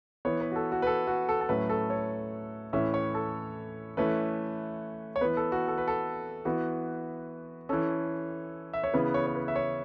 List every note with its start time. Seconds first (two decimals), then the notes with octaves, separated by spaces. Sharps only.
0.25 E3 B3 C#5
0.41 B4
0.52 F#4
0.56 A4
0.72 F#4
0.82 B4
0.87 A4
1.07 F#4
1.29 A4
1.41 A4
1.49 A2 F#3 A3 C#4 B4
1.69 A4
1.90 C#5
2.73 A2 E3 C#4 E5
2.94 C#5
3.14 A4
3.97 E3 A3 C#4 B4
5.16 C#5
5.21 E3 B3 B4
5.37 A4
5.52 F#4
5.68 A4
5.78 B4
5.88 A4
6.45 E3 B3 F#4
7.69 E3 C#4 A4
8.73 E5
8.84 C#5
8.94 C#3 E3 B3 B4
9.14 C#5
9.27 C#5
9.35 B4
9.48 E5
9.56 C#5